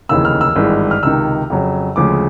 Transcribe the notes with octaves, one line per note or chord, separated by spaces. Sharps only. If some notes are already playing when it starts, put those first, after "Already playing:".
F1 D#2 C#3 E3 E6
F6
E6
G#1 G2 E3 G#3
F6
C#2 C3 D#3 E6
F2 C#3 F#3
D2 C#3 F3 G#3 D6